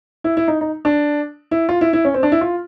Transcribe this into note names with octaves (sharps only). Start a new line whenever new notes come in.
E4
E4
D#4
D#4
D4
E4
F4
E4
E4
C#4
C4
D4
E4
F4